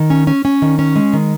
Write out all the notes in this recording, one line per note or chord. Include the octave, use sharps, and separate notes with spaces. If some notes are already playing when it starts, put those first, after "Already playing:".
Already playing: D#3
C#4
C#4
C#4
D#3
C#4
G#3
D#3